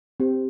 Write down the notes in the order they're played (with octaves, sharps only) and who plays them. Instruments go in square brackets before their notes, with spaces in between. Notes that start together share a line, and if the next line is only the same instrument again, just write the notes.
[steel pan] C4 [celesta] G4